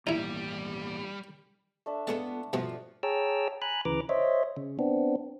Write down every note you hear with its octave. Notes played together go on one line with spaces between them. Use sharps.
G#1 E2 A#2 G3 D#4 E4
A3 D4 E5
G#3 B3 F4 A4 A5
G2 B2 F3 F#4
G#4 C#5 G5 A5 A#5 E6
G#5 A#5 B5 F#6
D2 C#3 E3 B4 A#5 D6
C5 C#5 D#5 E5
C#3
B3 C4 D4